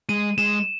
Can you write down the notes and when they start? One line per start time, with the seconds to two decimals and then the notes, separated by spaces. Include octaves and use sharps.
0.09 G#3 D#7
0.38 G#3 E7